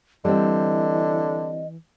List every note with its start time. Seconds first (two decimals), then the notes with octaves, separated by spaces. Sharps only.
0.25 D3 E3 G3 C4 D#5